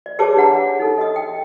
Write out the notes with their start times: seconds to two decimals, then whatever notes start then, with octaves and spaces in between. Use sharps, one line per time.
0.06 D5
0.19 G4 G#4 B4 C#5 A5 D6
0.37 D4 F#5 A#5
0.79 D#4 A4
0.98 D#5 D#6
1.16 G5